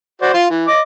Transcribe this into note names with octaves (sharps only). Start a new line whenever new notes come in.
F#4 C5 D5
F4 C6
E3
D#5 D6